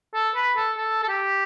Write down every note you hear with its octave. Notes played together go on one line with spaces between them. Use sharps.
A4
B4
A4
A4
A4
G4